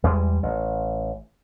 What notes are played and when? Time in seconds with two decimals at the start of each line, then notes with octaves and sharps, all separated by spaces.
0.04 E2 G3 G#3
0.43 A1